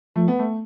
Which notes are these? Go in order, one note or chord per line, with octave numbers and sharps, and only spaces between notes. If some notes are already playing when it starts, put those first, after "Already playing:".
F3 A3
B3
A3